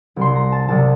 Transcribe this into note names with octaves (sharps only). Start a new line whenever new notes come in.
C2 C3 G3 C6
A#5
A5
C2 C3 G3 A5